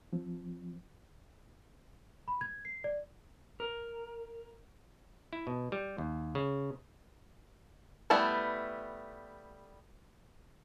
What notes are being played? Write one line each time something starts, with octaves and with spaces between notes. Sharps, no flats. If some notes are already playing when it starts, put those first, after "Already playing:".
F3 C4
B5
G#6
C7
D5
A#4
E4
B2
G3
D#2
C#3
G3 A3 B3 E4 A5